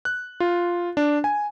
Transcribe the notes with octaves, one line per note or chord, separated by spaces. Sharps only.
F#6
F4
D4
G#5